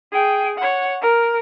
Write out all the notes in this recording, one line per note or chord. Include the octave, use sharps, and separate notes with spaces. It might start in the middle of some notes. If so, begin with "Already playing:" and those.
G#4 G5
C#5 F#5
A#4